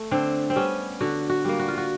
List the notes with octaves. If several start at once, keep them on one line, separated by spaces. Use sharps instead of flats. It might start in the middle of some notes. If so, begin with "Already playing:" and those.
Already playing: A3
D3 C4
C4
G3 B3 C#4
D3 F#4
F#4
G3 A#3
F#4
F4
F#4